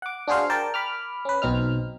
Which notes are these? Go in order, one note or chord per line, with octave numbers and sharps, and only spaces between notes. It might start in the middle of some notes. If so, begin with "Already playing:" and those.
F#5 D6
D4 F#4 G#4 C5 F5
A#4 D5 G5 A5
B5 D6 F6
C#4 B4
B1 B2 C4 D#4 F6